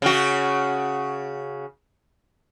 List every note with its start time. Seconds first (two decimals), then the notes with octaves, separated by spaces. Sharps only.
0.02 C#3 F#4